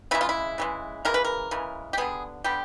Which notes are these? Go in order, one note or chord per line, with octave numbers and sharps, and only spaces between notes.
C#3 E3 G#3 E4
F4
E4
C#3 E3 G#3
C#3 E3 G#3 A#4
B4
A#4
C#3 E3 G#3
G4
D3 G3 B3 G#4
D3 G3 B3 G4